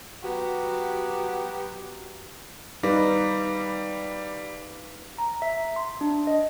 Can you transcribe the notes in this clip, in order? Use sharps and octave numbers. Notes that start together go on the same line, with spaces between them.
F#3 B3 F#4 G4
G3 D#4 B4 F5 D6 A#6
A#5
E5
C6
D4
D#5